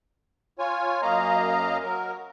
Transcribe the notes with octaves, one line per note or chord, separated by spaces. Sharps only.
F4 C#5 G#5
F#2 A#3 D#5 F5 A#5
F#3 A#4